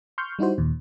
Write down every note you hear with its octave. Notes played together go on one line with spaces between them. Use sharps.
C6 C#6 F6 G6
G3 D#4 E4 F#4 C5
D#2 A#2